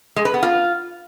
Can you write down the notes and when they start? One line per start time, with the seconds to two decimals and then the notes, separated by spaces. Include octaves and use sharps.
0.16 G#3
0.25 B4
0.34 B3
0.43 F4